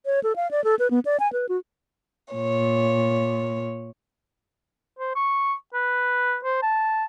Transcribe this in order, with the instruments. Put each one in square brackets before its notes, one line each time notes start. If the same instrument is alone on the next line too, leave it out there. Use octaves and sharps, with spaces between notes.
[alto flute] C#5
A4
F5
D5
A4
B4
B3
D5
G#5
B4
F#4
[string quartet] A#2 C#5
[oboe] C5
C#6
B4
C5
A5